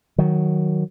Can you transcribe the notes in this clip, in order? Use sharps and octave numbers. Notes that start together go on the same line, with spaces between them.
D#3 F#3